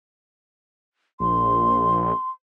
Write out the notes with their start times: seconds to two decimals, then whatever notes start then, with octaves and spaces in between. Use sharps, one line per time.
1.20 A#1 C6